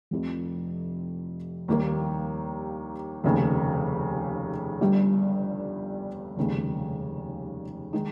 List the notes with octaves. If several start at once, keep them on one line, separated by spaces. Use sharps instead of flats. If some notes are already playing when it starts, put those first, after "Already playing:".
F1 F2 C3 F3
D#2 D#3 G3 A#3
F1 D#2 C#3
G1 G2 G3
F1 D#2 C#3 G#3
D#3 G#3 D#4